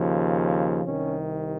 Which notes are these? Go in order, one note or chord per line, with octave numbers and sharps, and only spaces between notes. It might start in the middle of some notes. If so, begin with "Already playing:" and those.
Already playing: D#2 C#3 F3
C2 C3 D#3 C#4